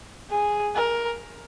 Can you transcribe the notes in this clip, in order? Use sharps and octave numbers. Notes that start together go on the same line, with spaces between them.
G#4
A#4